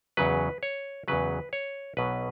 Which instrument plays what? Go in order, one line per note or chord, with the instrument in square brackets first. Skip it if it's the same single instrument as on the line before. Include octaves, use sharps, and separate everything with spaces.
[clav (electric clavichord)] E2 C#3 F#3 B4
C#5
E2 C#3 F#3 B4
C#5
B1 B2 F#3 B4